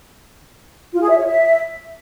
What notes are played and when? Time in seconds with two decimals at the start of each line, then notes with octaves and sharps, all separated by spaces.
0.94 F4
1.02 G#4
1.10 E5
1.17 C#5
1.25 E5